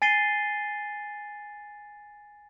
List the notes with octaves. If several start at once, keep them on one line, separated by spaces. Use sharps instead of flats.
G#5 A6 C7 D#7 G7